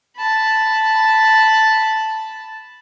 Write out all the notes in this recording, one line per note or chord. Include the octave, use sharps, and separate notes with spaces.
A5 B5